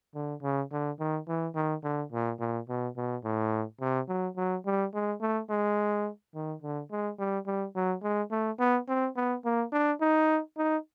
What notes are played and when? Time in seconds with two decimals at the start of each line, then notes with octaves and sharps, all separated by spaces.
0.15 D3
0.43 C#3
0.72 D3
1.00 D#3
1.28 E3
1.55 D#3
1.84 D3
2.13 A#2
2.40 A#2
2.69 B2
2.97 B2
3.24 A2
3.81 C3
4.09 F#3
4.37 F#3
4.66 G3
4.94 G#3
5.21 A3
5.50 G#3
6.35 D#3
6.63 D3
6.91 G#3
7.19 G3
7.47 G3
7.76 F#3
8.03 G#3
8.32 A3
8.59 B3
8.89 C4
9.16 B3
9.45 A#3
9.73 D4
10.01 D#4
10.57 D#4